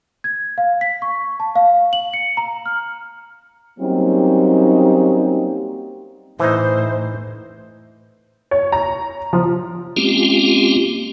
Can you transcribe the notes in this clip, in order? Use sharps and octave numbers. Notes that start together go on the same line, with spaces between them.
G#6
F5
B6
C#6
A5
F5
F#7
C#7
A#5
F6
F#3 G3 A#3 C4 C#4 D#4
A2 E3 D#4 C5
C#5
A#5
F3
G#3 A#3 C4 C#4 F4 G4